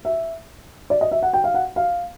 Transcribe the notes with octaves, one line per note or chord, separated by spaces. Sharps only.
E5
D5
D#5
E5
F#5
G5
F5
F#5
F5